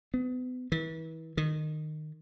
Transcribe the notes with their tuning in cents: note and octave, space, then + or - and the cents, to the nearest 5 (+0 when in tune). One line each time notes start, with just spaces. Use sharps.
B3 +35
E3 -35
D#3 -20